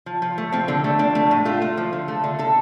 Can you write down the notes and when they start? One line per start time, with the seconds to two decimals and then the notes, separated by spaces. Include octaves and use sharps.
0.06 F3
0.22 F3
0.38 A3
0.52 F3 C4
0.68 D3
0.84 A3
0.99 F3 D4
1.15 A3
1.31 A2
1.45 A3 F4
1.62 A3
1.77 F3
1.93 D3
2.08 A3
2.24 D3
2.39 D3 A4